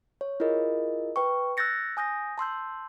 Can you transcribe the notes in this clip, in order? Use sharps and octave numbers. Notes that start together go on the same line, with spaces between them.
C#5
E4 F4 G#4 A#4 D#5
B4 G5 C#6
E6 F#6 G6 A6 A#6 C#7
G#5 D#6 G6 A#6
A5 C6 E6 G6